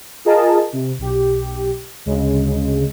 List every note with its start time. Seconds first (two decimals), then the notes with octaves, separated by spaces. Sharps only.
0.25 F4 G#4 A#4 D#5 A5
0.73 C3
0.99 B1 G4
2.06 D2 C#3 G#3